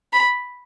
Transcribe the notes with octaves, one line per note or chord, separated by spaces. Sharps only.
B5